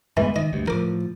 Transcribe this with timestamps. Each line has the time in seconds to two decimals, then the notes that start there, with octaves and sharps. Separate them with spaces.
0.17 G2 E3 G#3 A#3 B3
0.36 D#3 D#5
0.53 D2 G2
0.68 A2 F3 A#4 D6